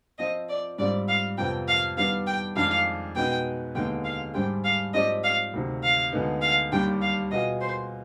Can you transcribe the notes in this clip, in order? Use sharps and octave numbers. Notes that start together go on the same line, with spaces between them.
F3 C4 F4 C5 D#5
D5
G#2 G3 C4 F4 D5
F5
F2 C3 F3 B3 F4 G5
F5
D#3 G3 B3 D4 F5
G5
F2 D#3 G#3 D4 F4 F5
B2 G#3 B3 D#4 B4 G5
D#2 D3 G#3 B3 D#4 G5
F5
G#2 G3 D4 G#4 C5 G5
F5
G#2 F3 C4 G4 D5 D#5
F5
D2 C3 D#3
F5
D2 D3 G#3 B3 D#4
F5
D#2 D#3 G3 D4 G5
F5
B2 B3 F4 G#4 D#5
C5